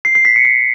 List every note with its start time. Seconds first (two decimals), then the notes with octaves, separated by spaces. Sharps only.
0.05 C7
0.15 C7
0.25 B6
0.36 C#7
0.45 C7